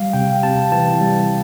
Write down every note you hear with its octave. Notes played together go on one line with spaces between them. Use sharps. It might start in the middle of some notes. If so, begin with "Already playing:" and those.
Already playing: G3 F5
C3 G5
C3 A5
E3 A5
G3